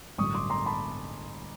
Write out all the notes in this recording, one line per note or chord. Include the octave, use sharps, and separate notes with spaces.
A1 G2 D3 F#3 C#6 D#6
C6 D6
A#5 C6
A5 B5